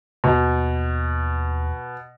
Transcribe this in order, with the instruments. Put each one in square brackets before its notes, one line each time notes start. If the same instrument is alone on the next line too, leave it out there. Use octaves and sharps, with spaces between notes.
[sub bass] D#2 [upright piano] B2